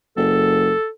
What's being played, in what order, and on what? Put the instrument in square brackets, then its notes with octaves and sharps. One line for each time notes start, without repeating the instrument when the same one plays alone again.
[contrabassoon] F#1 [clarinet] A4